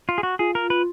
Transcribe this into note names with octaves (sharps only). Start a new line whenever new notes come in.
F4
G#4
F#4
F4 G#4
A#4
B4